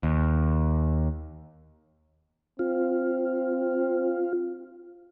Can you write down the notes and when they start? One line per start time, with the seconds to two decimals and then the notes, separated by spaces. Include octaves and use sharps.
0.03 D#2
2.59 C4 F4